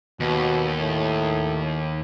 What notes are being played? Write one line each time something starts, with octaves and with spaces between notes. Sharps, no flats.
D#2 B2
A2